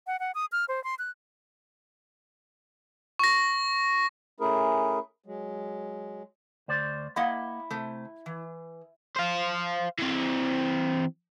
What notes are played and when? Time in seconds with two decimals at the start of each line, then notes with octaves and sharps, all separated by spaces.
0.07 F#5
0.20 F#5
0.35 D#6
0.52 F6
0.69 C5
0.84 C6
0.99 F#6
3.19 C#6 A#6
4.40 A3 C#4 E4 G#4 A#4
5.26 F#3 G#3
6.68 D2 C5 D5
7.16 A#3 E4 D#5 F#5
7.71 C3 A3
8.26 E3
9.16 C5 F5
9.98 E3 C4